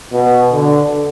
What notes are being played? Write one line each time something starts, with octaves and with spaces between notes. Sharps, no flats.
B2
D3